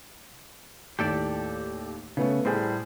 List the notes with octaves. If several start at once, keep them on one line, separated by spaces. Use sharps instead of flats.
D#2 A2 G4 A4 D5
C#3 A3 B3 C#4
A2 G3 G#4 C5